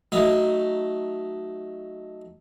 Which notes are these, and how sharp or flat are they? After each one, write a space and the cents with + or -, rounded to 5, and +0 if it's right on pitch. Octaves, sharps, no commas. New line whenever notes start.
F#3 +10 A3 +0 D#4 +0